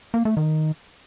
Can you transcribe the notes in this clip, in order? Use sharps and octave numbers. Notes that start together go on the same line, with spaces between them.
A#3
A3
D#3